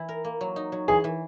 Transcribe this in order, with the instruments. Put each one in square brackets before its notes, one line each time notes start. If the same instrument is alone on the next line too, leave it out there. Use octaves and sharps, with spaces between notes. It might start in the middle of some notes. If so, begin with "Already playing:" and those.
Already playing: [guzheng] E3 E4
A#4
A#3
F#3
D#4
F#3
[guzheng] E3 [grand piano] G#4
[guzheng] E3